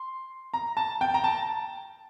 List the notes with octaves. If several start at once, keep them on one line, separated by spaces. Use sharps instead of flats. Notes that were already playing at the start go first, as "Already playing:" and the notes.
Already playing: C6
A#5
A5
G5
A#5
A5